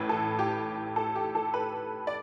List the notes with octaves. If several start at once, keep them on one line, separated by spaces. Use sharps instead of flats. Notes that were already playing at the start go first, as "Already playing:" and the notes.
Already playing: A1 A2 E3 B4
A4
G4
A4
G4
A4
B4
D5